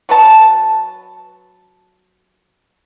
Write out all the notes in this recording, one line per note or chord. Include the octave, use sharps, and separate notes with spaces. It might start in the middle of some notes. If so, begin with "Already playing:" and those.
F#3 B4 A5